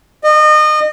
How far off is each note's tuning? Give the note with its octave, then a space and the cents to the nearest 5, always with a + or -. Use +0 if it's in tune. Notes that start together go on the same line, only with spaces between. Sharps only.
D#5 -30